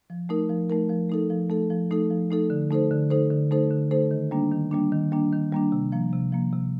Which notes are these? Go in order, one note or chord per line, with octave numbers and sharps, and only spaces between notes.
F3
A3 D#4 A#4
F3
A3 D#4 A#4
F3
A3 D#4 A4
F3
A3 D#4 A4
F3
A3 D#4 A4
F3
A3 D#4 A4
D3
A3 D#4 A4 C5
D3
A3 D#4 A4 C5
D3
A3 D#4 A4 C5
D3
A3 D#4 A4 C5
D#3
G3 A#3 D4
D#3
G3 A#3 D4
D#3
G3 A#3 D4
D#3
G3 A#3 D4
C3
F3 A#3
C3
F3 A#3
C3